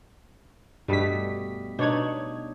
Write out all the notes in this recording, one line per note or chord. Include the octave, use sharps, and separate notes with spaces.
G2 B2 G3 A3 B6
B2 D4 D#4 C#5 G#6